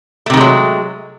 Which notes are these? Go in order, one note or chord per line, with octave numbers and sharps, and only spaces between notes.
C3 D#3 F#3 G#3 A3